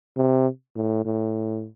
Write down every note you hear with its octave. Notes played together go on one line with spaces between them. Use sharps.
C3
A2
A2